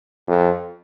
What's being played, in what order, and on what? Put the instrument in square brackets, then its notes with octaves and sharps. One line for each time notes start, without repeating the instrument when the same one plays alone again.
[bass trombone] F2